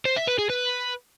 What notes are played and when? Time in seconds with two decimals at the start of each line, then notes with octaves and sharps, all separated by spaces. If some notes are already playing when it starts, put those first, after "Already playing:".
0.05 C5
0.17 E5
0.28 B4
0.39 G#4
0.50 B4